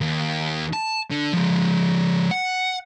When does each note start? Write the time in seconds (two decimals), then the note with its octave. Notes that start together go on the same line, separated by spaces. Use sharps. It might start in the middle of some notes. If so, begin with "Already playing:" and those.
0.01 D#2
0.73 A5
1.10 D3
1.33 F3 G#3
2.31 F#5